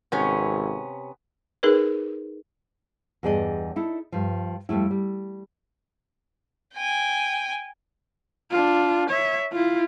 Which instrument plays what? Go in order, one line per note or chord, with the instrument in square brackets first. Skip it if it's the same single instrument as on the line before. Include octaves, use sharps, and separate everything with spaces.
[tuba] G#1 [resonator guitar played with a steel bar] C3 B3 C#4
[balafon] D#4 G#4 A#4 B4
[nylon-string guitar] E2 G2 G#4 D5 D#5
D#4 E4 A4
G2 F3
F2 G3 A3 E4
G3
[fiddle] G5 G#5
[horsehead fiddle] D4 F4
C#5 E5
E4 F4